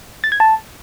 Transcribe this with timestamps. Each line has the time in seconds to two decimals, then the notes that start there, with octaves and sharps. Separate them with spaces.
0.24 A6
0.32 G#6
0.40 A5